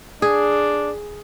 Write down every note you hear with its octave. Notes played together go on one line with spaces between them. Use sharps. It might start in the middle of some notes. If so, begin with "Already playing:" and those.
D4 G#4